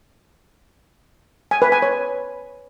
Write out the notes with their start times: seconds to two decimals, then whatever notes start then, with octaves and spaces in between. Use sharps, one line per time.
1.51 G#5
1.62 B4
1.72 G#5
1.82 C#5